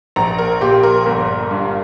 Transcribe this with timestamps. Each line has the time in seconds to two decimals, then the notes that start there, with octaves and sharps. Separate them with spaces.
0.16 A#1 A#5
0.38 A#4
0.61 A#2 G4
0.83 A#4
1.06 G1 A#4
1.51 G2